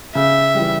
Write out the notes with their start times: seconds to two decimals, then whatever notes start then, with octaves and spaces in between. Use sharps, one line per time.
0.15 C#3 E5
0.55 E3 G3